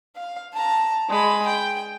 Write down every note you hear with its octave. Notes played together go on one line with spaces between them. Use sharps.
F5
A5 A#5
G#3 B5
G5